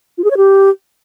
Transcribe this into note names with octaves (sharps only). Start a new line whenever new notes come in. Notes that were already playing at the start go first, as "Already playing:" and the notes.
F4
G#4
C#5
G4